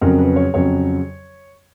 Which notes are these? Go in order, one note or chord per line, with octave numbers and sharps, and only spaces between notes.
F2 C#3 F#3 A#4
B4
C#5
F2 C#3 F#3 C#5